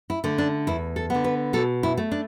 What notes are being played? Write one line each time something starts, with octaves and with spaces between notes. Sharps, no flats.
E4
D3 A3
D4
E2 E4
A4
D3 B3
B4
B2 A4
E4
A3
D4